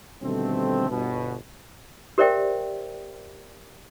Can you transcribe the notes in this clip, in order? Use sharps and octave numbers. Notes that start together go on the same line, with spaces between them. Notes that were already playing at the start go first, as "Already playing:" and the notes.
B2 D3 D#3 G3 A3 C4
G1 B2
G4 A#4 C5 D5 E5 G5